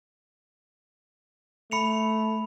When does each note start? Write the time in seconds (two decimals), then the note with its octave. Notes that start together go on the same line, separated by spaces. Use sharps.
1.71 A3 B5 C#7 F7